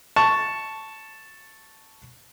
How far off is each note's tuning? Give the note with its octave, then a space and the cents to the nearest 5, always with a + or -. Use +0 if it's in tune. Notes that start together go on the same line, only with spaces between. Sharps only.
A5 +0 C#6 +0